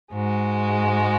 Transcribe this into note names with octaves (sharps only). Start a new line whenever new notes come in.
G#2 G#3 F#4